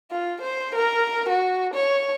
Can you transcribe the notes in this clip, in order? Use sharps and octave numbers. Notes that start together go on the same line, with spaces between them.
F4
C5
A#4
F#4
C#5